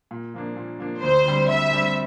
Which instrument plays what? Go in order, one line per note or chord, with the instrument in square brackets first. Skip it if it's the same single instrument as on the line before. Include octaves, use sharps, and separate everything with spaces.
[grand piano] A#2
F3 A#3 D4
A#2
F3 A#3 D4
[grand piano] D2 [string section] C5
[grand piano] D3 G3 C4
[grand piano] D2 [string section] E5
[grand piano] D3 G3 C4